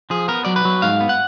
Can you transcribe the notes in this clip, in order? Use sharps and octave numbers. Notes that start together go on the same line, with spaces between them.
F3 G#4
B3 A#4
F#3 D5
B4
F#3
G#2 F5
B3
F#5